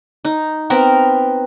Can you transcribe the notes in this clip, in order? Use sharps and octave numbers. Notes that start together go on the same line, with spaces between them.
D#4
B3 C4 A#4 B4